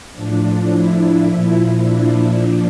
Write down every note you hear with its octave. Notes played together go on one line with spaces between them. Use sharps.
A2 F3 D4
E4
A#2 F3 E4
D4
A#2 F3 D4